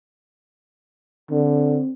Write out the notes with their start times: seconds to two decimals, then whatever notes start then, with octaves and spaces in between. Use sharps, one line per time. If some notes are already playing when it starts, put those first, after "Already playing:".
1.31 D3 C4